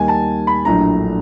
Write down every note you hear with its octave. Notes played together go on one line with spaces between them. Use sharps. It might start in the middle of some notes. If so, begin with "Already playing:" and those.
Already playing: D#2 D#3 G3 G#5
A5
B5
A#1 A2 F#3 A3 D4 A#5